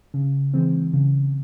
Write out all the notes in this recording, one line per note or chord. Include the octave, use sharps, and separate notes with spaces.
C#3
E3 G#3 C4
C#3